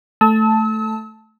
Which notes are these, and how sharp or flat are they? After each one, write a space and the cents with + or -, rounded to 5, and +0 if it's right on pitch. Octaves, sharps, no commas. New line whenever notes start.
A3 +0 A5 +0 E6 -40